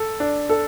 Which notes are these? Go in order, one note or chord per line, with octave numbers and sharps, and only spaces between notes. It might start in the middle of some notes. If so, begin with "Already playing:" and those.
Already playing: A4
D4
A4